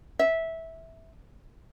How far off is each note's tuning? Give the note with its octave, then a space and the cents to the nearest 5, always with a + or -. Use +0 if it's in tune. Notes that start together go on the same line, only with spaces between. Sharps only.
E5 -15